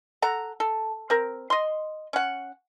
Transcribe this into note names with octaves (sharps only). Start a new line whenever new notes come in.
A4 F#5 A#5
A4
C4 A#4
D#5 C6
C#4 F#5